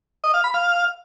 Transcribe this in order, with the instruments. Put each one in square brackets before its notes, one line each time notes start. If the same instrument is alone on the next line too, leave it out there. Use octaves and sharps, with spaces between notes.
[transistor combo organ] D#5
F5
B5
F5